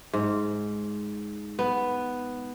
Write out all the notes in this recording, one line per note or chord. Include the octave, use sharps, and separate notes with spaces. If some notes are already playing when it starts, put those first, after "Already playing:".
G#2
B3